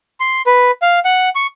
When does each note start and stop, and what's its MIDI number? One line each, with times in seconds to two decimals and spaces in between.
0.20 0.42 84
0.46 0.71 71
0.82 0.99 77
1.05 1.29 78
1.35 1.47 85